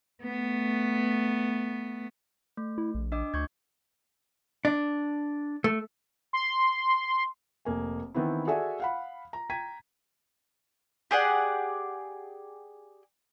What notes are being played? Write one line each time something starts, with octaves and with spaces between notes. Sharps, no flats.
A3 B3
A3
E4
A#1
D4 D#5 D6
D2 C#6 G6 G#6
D4
A3
C6
F1 A#3 G#5
D#3 E3 B3 C4 E4
F#4 G#4 A4 D5 E5 G#5
F5 F#5 B5
A#5
G5 A#5 G#6 B6 D#7
G4 G#4 D5 F#5